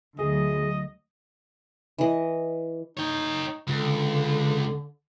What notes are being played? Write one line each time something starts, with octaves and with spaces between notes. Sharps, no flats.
D2 F#3 G#4 D#5
E3 D#5
D#4 C#5 G5
C#2 D3